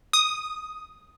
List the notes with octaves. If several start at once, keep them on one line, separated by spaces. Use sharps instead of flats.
D#6